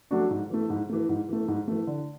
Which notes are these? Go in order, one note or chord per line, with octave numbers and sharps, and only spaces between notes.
F#3 A3 D4 F#4
G#2
E3 A3
G#2
E3 A3
G#2
E3 A3
G#2
E3 A3
D3